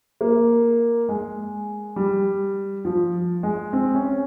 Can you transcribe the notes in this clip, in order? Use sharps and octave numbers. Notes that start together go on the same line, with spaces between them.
A#3
G#3
G3
F3
G#3
C4
C#4